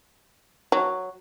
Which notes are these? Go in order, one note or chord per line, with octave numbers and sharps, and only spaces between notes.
F#3